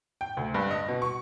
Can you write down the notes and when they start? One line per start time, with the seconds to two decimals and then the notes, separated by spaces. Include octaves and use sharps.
0.21 G5
0.37 D2
0.55 G2
0.71 D#5
0.88 B2
1.02 C#6